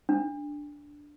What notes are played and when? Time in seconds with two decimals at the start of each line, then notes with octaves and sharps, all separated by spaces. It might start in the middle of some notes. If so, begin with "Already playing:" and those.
0.09 D4